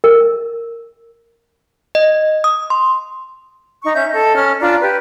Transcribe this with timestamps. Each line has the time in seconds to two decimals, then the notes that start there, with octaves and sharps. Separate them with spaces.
0.04 A#4
1.95 D#5
2.44 D#6
2.70 C6
3.84 D#4 C#6
3.95 C#4 E5 G6
4.10 A4 D#5
4.35 C#4 F6
4.61 D4 F4 D5 A#5
4.81 G4 B4